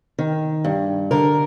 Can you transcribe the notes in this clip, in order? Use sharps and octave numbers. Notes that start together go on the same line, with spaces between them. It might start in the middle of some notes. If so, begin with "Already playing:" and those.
D#3
G2
D3 A#4